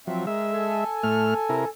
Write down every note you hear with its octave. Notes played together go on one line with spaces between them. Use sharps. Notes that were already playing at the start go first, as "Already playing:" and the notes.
F3 F#3 C4 E5
G#3 A#4 E5
A4 G#5
A2 A3 F6
C3 E4 A#4